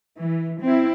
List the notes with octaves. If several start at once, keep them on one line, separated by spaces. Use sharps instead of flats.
E3
C4 E4